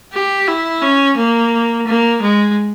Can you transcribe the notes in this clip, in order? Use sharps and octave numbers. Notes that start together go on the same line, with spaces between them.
G4
E4
C#4
A#3
A#3
G#3